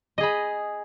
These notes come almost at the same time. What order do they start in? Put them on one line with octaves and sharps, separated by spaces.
D#5 G#4 B5